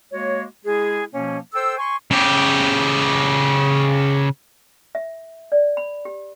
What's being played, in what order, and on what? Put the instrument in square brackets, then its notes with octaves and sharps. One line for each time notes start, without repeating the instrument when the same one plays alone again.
[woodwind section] G#3 A#3 F#4 C#5
G#3 E4 G#4
B2 F3 A#3 C#4
A4 C5 G5 E6
G#5 C6 C#6
[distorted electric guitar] C#3 G4
[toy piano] E5
D5
B5
G4